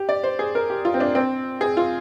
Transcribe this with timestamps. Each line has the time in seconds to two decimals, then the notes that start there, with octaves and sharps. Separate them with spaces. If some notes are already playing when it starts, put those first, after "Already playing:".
Already playing: G4
0.09 D5
0.23 C5
0.39 G#4
0.55 A#4
0.70 G4
0.85 F4
0.94 C4
1.00 D4
1.15 C4
1.61 G#4
1.77 F4